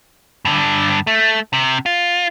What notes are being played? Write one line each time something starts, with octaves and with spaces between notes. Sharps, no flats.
G2 D3
A3
C3
F4